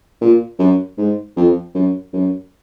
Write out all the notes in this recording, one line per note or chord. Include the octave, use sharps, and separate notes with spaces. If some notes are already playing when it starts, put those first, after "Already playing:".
A#2
F#2
G#2
F2
F#2
F#2